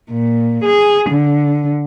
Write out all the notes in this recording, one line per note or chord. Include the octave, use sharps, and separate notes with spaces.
A#2
G#4
D3